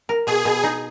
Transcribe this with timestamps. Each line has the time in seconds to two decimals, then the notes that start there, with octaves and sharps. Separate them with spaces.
0.09 A#4
0.27 B2 G#4
0.45 B2
0.63 D#4